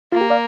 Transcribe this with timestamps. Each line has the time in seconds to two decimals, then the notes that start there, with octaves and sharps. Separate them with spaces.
0.12 A#3 F4
0.21 G4
0.30 D5 F5